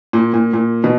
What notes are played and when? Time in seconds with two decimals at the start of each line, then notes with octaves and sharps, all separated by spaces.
0.13 A#2
0.34 A#2
0.53 A#2
0.84 B2